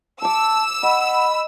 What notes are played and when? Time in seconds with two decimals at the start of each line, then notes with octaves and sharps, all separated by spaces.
0.22 A5 C#6 D6 E6
0.83 D#5 F#5 B5